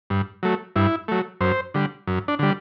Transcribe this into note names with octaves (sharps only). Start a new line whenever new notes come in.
G2
F#3 A3
G2 E4
F#3 A3
F#2 C5
D3 G3
F#2
D4
D3 G3